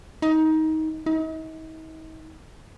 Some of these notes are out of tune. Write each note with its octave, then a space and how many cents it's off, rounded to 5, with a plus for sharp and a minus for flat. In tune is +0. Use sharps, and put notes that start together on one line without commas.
D#4 +20
D#4 +40